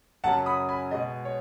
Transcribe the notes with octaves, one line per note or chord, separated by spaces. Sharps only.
F#2 C#3 F#3 F#5 A5
B5 D#6
G#5 B5
B2 G#3 B3 D#5
C#5